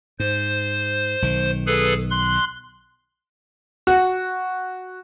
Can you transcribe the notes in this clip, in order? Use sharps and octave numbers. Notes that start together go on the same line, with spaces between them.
G#2 C5
B1 D#3
G#4 A4 B4
C6 F#6
F#4